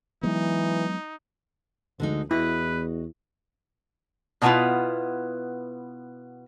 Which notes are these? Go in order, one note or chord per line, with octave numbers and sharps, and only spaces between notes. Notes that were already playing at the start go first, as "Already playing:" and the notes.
E3 F#3 G#3 B3 D#4
D2 D3 G#3 D#4
E2 E4 F#4 B4 D#5
B2 D#3 F#3 B3 E4 F4